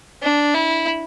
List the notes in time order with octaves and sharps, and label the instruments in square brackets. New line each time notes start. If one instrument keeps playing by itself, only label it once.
[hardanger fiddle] D4
E4